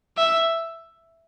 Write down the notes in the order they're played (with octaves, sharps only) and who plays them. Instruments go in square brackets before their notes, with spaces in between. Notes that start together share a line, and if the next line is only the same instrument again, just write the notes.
[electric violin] E5